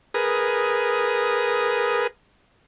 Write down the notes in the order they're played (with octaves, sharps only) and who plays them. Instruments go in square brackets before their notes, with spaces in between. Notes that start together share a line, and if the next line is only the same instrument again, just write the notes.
[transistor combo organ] G#4 A#4 B4 D#6